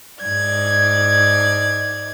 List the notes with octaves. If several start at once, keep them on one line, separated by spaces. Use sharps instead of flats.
G#2 D5 G#6